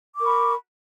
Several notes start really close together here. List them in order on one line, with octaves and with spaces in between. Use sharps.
D6 A#4 C#6 B5